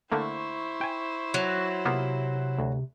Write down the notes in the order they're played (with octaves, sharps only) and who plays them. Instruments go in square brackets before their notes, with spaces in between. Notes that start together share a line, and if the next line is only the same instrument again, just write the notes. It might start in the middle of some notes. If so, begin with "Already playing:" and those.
[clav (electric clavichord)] D3 A3 A#3 [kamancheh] E4 C5 [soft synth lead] C#6
[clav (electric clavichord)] G5 G#5
[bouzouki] F#3
[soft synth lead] C3 [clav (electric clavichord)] A#3 B3 F4
[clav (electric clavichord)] D2